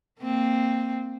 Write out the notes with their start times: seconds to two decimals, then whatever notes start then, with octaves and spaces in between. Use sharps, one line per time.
0.20 A#3 C4